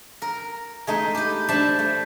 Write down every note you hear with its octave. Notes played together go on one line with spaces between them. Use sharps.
A#4
G#3 A3 D#4
G4 B4
D4 A4 C5 E5 A5 B5
A3